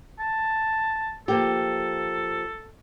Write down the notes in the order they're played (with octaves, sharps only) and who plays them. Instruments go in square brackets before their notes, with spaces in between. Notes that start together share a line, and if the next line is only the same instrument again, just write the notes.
[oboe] A5
[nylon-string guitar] F3 A#3 G4 [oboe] A4